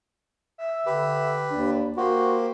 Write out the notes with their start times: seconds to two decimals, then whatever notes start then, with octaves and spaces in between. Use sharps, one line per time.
0.58 E5
0.86 D3 G4 B4
1.50 D#2 D4
1.97 A#3 F#4 G4 C5